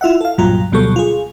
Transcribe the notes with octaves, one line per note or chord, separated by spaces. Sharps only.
E4 F4 E5 F#5
A4 F5
C2 G2 A#2 F#3 F4 A#5
D2 B2 F#3 G3 A4 C#6
F4 G#4